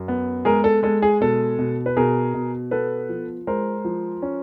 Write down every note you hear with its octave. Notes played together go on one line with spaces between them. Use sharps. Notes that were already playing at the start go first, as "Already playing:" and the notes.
Already playing: F#2
B3
G#3 G#4 A#4
A4
G#3 A4
G#4
B2 A4
B2
B4
B2 G#4 A#4
B2
B3 A4 B4
F3
G#3 A#4 C5
F3
C#4